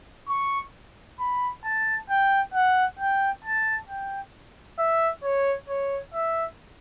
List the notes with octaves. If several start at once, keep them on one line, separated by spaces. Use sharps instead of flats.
C#6
B5
A5
G5
F#5
G5
A5
G5
E5
C#5
C#5
E5